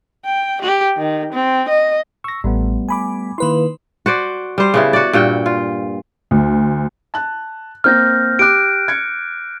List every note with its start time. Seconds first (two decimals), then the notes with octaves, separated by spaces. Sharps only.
0.24 G5
0.62 G4
0.97 D#3
1.33 C4
1.69 D#5
2.24 C#6 E6 A#6
2.44 A1 G3 A3 B3
2.89 G#5 B5 D6
3.38 D#3 A#3 E4 B4 C6
4.06 F#4 C5 D5
4.58 G3 C5
4.74 C#3 B3 E4
4.93 F#4 D5
5.13 G2 A#2 F#4 G5
5.46 F4
6.31 D2
7.14 A5 F#6
7.84 A#3 C4 F6 G6 A#6
8.39 G4 D6 F#6 D7
8.88 G#6 C#7